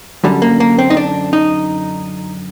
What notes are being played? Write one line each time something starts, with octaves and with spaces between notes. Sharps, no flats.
F#2 D3 G3
A#3
A#3
C4
D#4
D4
D#4